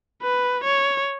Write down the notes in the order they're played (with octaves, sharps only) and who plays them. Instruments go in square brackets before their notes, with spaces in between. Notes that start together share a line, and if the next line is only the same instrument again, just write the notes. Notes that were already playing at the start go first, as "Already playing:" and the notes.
[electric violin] B4
C#5